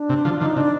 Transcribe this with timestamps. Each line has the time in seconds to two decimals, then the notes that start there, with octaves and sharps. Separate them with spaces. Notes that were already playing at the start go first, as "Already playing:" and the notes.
Already playing: D4
0.09 C3
0.25 D3 F3
0.40 D3 F3 D#4
0.56 C3 D4